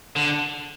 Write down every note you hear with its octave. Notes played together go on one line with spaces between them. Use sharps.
D3